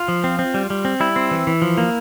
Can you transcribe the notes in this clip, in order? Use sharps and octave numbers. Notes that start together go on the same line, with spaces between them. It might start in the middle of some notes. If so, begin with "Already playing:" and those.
Already playing: F4
F3
C4
C4
G3
G3
C4
G3 E4
C4
E3
E3
F3
A#3